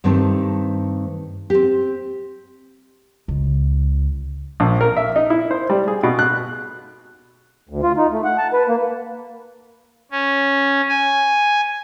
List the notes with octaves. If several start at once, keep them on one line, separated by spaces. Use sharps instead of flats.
G2 D#3 A3 C4 D#4
C4 G4
C#2
A#1
A#4
E5
D#4
E4
C5
G3
G#4
B2
F#6
D2
F4
D#4
A3
F#5
A5
B4
A#3
C#4
G#5